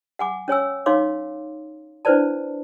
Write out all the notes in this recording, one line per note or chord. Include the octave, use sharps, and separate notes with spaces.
F#5 G#5 D6
C#4 C#5 G#5 E6
D#4 C#5 F5 C6 D6
D4 E4 B4 C5 D5 A5